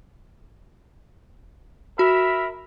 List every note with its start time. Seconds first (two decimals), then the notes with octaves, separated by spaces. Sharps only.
1.99 F#4 A#4 E5 B5